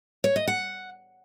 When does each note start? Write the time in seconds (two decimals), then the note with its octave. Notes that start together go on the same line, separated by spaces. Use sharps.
0.24 C#5
0.36 D#5
0.48 F#5